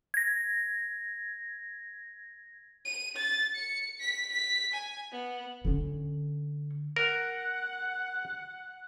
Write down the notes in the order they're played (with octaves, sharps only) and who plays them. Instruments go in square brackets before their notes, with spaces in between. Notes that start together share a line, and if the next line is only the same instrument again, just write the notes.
[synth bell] G#6 A#6
[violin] D#7
A6
C#7
B6
B6
G#5
B3
[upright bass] D3 C#4
[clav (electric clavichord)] A#4 [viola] F#5